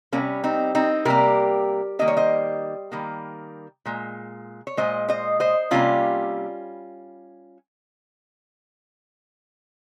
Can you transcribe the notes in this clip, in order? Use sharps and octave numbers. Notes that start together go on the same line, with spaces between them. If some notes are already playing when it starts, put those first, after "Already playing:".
C3 G3 A#3 C#4
C4 D#4
C4 D#4
C3 G3 A#3 G4 A#4
D#3 G3 A#3 D#5
C#5
C5 D#5
D#3 G3 A#3
A#2 G#3
C#5
A#2 G#3 C5 D#5
C5 D#5
C5 D#5
C3 G3 A#3 C#4 F4